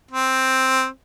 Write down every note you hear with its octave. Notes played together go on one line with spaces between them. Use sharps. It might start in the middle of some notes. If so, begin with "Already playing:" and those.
C4